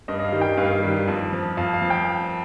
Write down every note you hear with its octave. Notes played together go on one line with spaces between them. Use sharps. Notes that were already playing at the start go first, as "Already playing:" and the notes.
G2 D#5
D#5
F5
D#3 G3
G5
G2 F5
D#3 G3
F2
F3
F2 F5
F5
F3
G5